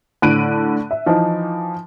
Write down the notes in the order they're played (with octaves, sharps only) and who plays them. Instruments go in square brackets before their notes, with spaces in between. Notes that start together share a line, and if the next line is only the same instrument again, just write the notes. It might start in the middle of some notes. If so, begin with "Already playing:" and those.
[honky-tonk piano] A2 D3 F#6 D7 D#7
E5
E3 F3 D#4